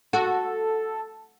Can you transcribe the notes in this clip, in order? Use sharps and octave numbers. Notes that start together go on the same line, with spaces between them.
F#4 A4